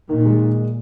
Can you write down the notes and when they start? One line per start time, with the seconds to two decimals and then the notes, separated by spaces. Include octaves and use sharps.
0.09 A#2 D#3
0.26 G#3